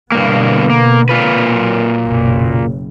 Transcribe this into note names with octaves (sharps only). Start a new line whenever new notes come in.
G2 B2 D3 A#3 B3
A#3
A#2 F4 B4
F#3 A#3
F#1 B1